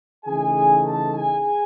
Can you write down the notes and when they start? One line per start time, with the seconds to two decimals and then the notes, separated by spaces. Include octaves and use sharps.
0.25 C#3 E3 A3 D#4 G#4 G#5
0.84 A4 A5
1.13 G#4 G#5